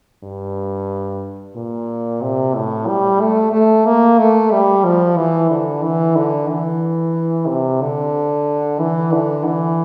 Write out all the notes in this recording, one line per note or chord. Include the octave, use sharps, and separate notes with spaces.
G2
A#2
C3
A2
G3
A3
A3
A#3
A3
G3
F3
E3
D3
E3
D3
E3
C3
D3
E3
D3
E3